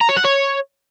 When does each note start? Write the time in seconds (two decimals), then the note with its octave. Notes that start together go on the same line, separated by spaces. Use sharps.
0.01 A#5
0.09 C#5
0.17 F#5
0.25 C#5